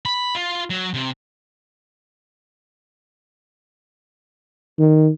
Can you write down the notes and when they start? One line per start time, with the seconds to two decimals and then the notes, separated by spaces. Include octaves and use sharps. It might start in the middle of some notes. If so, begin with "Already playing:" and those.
0.05 B5
0.35 F4
0.70 F#3
0.94 C3
4.78 D#3